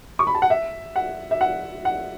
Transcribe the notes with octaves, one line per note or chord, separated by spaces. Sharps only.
C#6
B5
A5
F#5
E5
F#5
E5
F#5
F#5